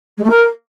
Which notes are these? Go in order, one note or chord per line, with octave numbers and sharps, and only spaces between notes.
G#3
A3
A#4